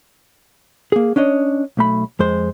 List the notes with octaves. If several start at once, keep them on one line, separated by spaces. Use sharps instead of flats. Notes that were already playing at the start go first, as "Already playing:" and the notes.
A#3 G#4
C#4 D4 C#5 D#5
B1 A3 B5
F2 G#3 C5